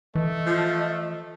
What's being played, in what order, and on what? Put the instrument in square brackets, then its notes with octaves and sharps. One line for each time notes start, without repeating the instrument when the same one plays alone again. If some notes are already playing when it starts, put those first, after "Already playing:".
[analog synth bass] E3 [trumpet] A3 [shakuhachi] D#5
[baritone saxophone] F3